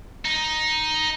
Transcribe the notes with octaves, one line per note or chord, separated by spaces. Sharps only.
D#4